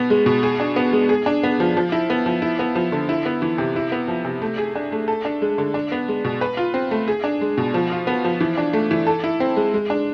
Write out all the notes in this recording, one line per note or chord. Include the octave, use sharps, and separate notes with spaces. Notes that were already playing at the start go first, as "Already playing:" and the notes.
Already playing: B2 B3
G#3
B2
G#4
D4
B3
G#3
G#4
D4
B3
F3
F3
E4
B3
F3
E4
B3
F3
D3
E4
B3
E3
C3
E4
B3
F3
C3
A3
G#4
D4
A3
A4
D4
G#3
D3
D4
B3
G#3
B2
B4
F4
C4
A3
G#4
D4
G#3
B2
F3
F4
B3
F3
E3
D4
A3
E3
A4
E4
C4
G#3
G#3
D4